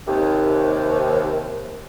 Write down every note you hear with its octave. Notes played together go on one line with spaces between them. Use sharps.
D#2 C3